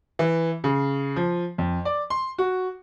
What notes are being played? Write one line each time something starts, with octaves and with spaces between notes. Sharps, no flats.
E3
C#3
F3
F2
D5
C6
F#4